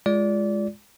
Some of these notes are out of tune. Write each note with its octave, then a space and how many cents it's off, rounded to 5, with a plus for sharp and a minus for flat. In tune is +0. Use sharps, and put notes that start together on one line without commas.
G#3 +0 F4 +0 D5 -20